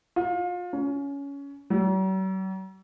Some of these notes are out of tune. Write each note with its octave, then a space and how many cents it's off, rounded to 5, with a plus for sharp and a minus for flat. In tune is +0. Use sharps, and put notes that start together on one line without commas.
F4 +30
C#4 +20
F#3 +45